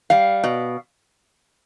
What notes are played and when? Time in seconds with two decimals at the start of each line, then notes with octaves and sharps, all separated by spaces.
0.10 G3 F5
0.44 B2